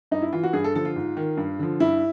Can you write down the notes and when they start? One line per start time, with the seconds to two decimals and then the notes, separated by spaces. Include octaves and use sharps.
0.11 G2 D#4
0.22 E4
0.33 E3 F4
0.43 F#4
0.53 G2 G#4
0.64 A4
0.75 D3 F3 A4
0.85 F4
0.96 G#2
1.17 D#3
1.37 G2
1.59 D3 F3
1.80 G2 E4